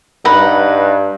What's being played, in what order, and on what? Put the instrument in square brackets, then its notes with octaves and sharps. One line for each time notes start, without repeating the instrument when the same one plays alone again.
[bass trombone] G2 [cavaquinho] D#4 B4 F#5